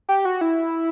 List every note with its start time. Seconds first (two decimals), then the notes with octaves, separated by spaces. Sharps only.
0.09 G4
0.25 F#4
0.41 E4